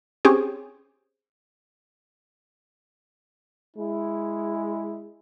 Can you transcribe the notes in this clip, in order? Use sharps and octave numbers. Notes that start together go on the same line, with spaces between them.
C4 C#4 G4 G#4
G#3 E4